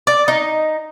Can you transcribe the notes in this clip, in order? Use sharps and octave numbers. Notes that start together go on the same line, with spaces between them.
D5
D#4